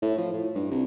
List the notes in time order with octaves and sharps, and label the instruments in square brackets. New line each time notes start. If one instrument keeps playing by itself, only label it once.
[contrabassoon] A2
F3
A2
G2
C2